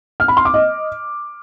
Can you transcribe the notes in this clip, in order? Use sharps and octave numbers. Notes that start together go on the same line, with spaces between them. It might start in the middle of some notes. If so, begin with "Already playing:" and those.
F6
B5
C6
D6
D#5